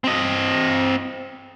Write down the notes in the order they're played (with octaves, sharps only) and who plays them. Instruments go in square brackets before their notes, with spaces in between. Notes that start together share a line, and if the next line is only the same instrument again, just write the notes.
[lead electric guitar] C4 D#5